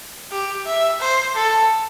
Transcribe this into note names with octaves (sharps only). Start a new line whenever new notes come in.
G4
E5
C5
A4